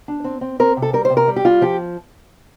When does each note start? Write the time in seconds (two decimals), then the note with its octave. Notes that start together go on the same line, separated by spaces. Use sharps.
0.08 D4
0.24 C4
0.41 C4
0.59 C4 A#4
0.77 C3
0.82 A4
0.93 G3 A#4
1.05 C5
1.10 C3
1.17 A#4
1.28 G3
1.36 G4
1.45 G3 F4
1.61 F3 G4